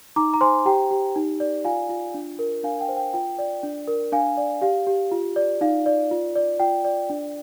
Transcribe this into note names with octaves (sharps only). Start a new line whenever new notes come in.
D#4 A#5 D6
A#5
C5 G#5 C6
G4 G5 A#5
G4
D#4
D5
F4 F5 G#5
F4
D4
A#4
D4 F5 G#5
G5
C5
G5
F4 G5
D5
D4
A#4
D4 F5 G#5
D5
G4 F5
G4
F4
D5
D#4 F5
D5
F4
D5
F4 G5
D5
D4